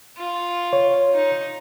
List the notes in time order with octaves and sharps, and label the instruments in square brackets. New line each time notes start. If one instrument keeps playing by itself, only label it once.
[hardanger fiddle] F4
[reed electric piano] C#5
[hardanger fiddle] D#4